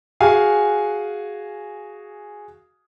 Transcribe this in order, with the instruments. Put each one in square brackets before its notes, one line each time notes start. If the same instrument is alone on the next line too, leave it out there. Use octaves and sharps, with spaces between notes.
[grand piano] F#4 G#4 F5 G#5